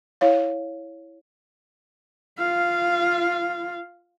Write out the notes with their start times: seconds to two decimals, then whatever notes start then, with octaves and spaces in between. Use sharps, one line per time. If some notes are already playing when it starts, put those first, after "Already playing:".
0.21 E4 C#5 F5
2.38 F4 F5